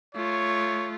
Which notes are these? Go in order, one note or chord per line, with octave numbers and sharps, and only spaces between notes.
A3 F4 C#5